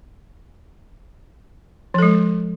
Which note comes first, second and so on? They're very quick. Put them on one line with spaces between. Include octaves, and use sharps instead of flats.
F3 A4 G#3